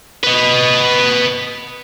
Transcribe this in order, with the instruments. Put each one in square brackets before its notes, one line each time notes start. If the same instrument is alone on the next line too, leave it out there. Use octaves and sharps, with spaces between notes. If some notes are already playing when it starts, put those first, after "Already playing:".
[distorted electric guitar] B4 D#5